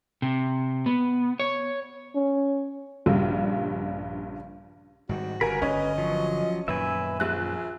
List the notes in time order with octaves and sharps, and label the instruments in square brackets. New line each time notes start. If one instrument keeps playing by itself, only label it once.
[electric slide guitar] C3
B3
C#5
[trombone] C#4
[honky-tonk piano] A#1 G2 C#3 G3
[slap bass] G#2 D#3 G3 [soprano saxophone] F#4
[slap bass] G1 G#2 C#3 [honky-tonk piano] A#4 [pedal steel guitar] B4 G#5 B5
[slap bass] G1 [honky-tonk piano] C#4 [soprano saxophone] D#5
[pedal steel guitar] F3 F#3
[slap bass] F#2 A#2 D#3 [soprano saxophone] B4 [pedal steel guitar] E5 G#5
[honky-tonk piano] A#1 F#6 [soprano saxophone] G#4